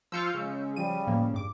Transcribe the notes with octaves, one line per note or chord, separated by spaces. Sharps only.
F3 F4 F5 E6 G6 C#7
C#3 G#3
F3 G3 D#7
A2 F3 A#3
G2 D6